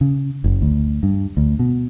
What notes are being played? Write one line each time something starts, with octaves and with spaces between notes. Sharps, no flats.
C#3
F#1
D2
G2
D2
B2